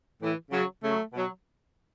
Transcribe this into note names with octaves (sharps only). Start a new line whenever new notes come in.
A2 E3
C#3 F#3
C#3 F#3 A3
B2 F#3